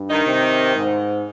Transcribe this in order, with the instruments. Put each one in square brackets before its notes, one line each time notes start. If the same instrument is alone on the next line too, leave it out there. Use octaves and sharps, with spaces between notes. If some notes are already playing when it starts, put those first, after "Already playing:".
Already playing: [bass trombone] G2
[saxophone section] D#3 D#4
[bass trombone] C3
G#2